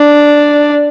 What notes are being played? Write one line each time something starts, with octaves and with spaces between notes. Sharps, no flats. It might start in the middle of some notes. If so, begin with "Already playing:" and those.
Already playing: D4